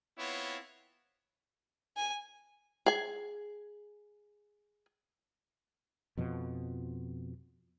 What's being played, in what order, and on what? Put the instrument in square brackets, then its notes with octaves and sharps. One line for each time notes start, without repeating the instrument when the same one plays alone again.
[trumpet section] B3 C4 E4 F4 C#5
[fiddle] G#5
[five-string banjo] G#4 G#5
[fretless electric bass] F2 B2 F3